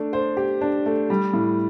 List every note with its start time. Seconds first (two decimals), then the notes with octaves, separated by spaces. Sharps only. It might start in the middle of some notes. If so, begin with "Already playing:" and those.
Already playing: A3 D4
0.13 C5
0.37 G4
0.61 D4
0.86 A3
1.10 G3
1.33 A2